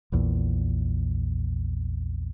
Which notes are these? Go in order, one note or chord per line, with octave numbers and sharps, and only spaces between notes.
A#1 E2 A#2